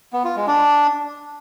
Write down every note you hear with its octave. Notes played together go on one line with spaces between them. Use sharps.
B3
F4
G#3
D4